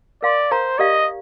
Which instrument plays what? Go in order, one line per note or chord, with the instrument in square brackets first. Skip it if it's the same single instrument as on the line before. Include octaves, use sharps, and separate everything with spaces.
[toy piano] A#4 F5 C6 [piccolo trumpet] D5
[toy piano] A#4 F5 A#5 [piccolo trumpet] C5
[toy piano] G4 A#4 D5 F5 [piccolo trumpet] D#5